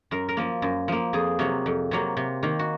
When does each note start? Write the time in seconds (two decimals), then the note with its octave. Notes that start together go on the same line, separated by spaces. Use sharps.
0.11 F#2 A#4
0.29 A#4
0.37 F3 A#3
0.62 F#2
0.88 F3 A#3
1.13 F2 G#4
1.39 C3 F#3 A#3
1.66 F2
1.91 C3 F#3 A#3
2.17 C3
2.43 D#3 A#3
2.59 F#4